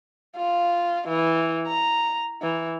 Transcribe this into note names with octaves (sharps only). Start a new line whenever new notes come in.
F4
E3
A#5
E3